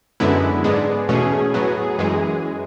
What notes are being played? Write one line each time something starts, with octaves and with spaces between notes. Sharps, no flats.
F#2 D3 G#3 B3 E4
G#2 G#3 B3 D4 G#4
E2 B2 A3 C#4 G#4
A2 F#3 B3 G#4
F#2 E3 G#3